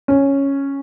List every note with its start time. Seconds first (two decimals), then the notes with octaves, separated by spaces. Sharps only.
0.08 C#4